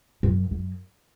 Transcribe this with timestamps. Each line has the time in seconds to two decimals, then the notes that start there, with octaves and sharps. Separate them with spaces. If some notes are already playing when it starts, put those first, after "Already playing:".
0.23 F#2
0.51 F#2